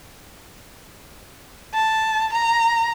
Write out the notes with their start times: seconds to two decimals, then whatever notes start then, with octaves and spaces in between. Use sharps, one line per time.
1.74 A5
2.33 A#5